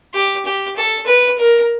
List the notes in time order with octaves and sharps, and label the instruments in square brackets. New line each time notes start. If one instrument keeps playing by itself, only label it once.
[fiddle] G4
G4
A4
B4
A#4